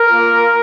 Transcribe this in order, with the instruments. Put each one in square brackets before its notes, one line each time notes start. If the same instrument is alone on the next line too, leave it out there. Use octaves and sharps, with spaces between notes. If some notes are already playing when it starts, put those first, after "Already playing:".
Already playing: [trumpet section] A#4
A#3 F4